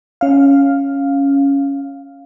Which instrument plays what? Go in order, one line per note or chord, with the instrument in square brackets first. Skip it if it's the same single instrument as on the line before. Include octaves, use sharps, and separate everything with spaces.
[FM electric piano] C#4 F5